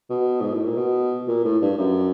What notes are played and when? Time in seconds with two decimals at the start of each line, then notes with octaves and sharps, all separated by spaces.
0.09 B2
0.41 G#2
0.53 A2
0.65 A#2
0.77 B2
1.28 A#2
1.44 A2
1.62 G2
1.78 F#2